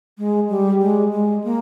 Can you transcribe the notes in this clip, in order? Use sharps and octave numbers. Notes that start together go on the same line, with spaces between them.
G#3
G3
G#3
G#3
A#3